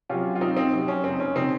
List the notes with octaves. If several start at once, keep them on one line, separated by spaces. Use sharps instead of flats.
C3 F#3 C#4 F4
F4
C2 C4 D#4
C4 D#4
C3 F#3
C#4
F#1 C4
D#4
C#4
C#3 C4 D#4